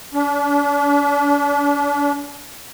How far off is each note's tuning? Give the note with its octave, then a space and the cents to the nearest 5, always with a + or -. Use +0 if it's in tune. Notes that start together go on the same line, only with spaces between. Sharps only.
D4 -40